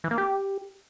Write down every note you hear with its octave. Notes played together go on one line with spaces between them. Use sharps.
E3
A#3
G4